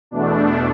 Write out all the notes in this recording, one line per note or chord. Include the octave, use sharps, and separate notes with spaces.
E2 B2 A3 D4